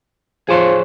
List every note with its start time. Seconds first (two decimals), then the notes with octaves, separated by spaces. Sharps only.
0.49 F3 G#4 C5 C#5